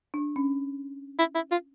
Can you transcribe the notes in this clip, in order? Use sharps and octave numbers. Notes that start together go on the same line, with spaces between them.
D4
C#4
E4
E4
F4